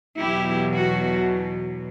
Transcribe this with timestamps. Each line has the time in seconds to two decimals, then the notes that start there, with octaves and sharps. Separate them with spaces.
0.18 E2 B2 F#3 E4 G4
0.72 F#4